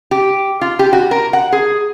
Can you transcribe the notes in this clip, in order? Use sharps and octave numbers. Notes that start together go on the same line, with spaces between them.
G4
F4
G4
F#4
A#4
F#5
G#4